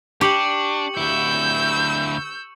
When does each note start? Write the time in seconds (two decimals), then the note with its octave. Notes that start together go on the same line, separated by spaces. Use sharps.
0.21 D4 G4 C#6 C#7 F#7
0.97 D2 E4 E6 G6